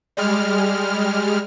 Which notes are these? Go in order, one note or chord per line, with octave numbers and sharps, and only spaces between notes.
G3 G#3 F6